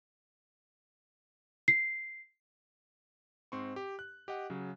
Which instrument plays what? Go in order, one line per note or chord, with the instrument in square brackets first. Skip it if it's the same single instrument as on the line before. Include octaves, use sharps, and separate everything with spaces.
[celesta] C7
[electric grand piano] G#2 C4 C6 C#6
G4
F#6
G4 D#5 F#5
C#3 F#3